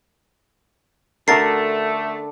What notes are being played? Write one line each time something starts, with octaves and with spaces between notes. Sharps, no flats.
D3 A3 D4 F#4 A#4 A6 C7